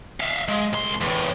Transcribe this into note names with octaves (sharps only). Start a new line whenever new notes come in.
E5 F5
G#3
C2 C6
E2 A2